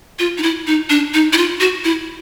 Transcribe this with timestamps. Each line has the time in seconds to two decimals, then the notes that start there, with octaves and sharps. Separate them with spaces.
0.19 F4
0.38 D#4
0.43 E4
0.67 D#4
0.90 D4
1.14 D#4
1.33 E4
1.38 F4
1.60 F#4
1.84 E4